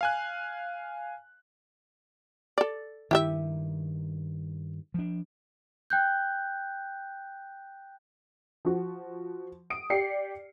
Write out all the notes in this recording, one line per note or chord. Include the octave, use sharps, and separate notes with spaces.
F5 G#5 F#6
A4 D5
G2 D#3 E4 G4 E5
F3 D4
G5 F#6 G6
F3 F#4
D#6 D7
G4 D5 C7 C#7